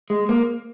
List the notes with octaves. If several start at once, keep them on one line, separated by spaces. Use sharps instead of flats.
G#3
A#3